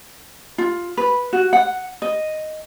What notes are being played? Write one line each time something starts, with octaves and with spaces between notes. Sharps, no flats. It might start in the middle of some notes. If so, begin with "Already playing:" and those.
F4
B4
F#4
F#5
D#5